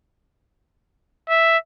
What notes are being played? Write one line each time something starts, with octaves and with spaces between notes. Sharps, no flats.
E5